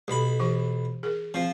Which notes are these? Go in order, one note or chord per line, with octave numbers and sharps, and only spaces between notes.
B1 G4 A4 B5
E3 G4 D6
G#4 A#4
F3 C4